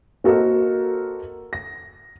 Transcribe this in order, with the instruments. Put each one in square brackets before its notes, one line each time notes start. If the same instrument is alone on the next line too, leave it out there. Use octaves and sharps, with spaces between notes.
[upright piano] A#3 F#4 A4 A#4 C5 D#5
A#6